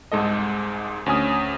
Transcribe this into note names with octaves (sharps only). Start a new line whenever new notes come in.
C2 G#2 G#3 A4 D#5
D2 C#4 G#5 D#6